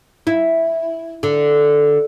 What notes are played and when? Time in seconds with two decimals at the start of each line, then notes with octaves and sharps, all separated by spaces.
0.27 E4
1.23 D3